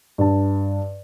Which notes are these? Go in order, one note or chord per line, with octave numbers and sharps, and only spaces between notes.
G2 A5